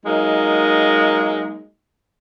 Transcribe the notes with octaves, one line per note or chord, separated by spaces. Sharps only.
F#3 G#3 A#3 D#4